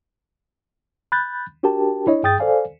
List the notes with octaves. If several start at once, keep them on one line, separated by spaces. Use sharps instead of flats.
B5 F#6 G6 A6
D4 F#4 G4 A#4 G5 A5
D4 E4 C#5 D#5
G2 G#4 G5 D#6 G6 A6
A4 C5 D5 F5 G#5